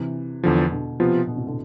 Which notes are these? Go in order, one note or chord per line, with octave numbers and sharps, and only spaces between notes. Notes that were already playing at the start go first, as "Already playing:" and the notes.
Already playing: C3 E3
E2 D3 F3
B2 D3
C3 F3 B3 F4
B2 D3
A2 C3
B2 D3